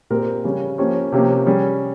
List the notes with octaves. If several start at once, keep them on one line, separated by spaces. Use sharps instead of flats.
A#2 G#3 C4 G4 A#4
C#3 G3 C#4
F3 A#3 C#4 G4
C3 F3 A#3 C#4 G4
G3 C#4 G#4